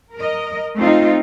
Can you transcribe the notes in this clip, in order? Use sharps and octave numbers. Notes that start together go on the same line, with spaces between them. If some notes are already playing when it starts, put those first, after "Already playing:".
A#4 D#5
A3 C4 D#4 F4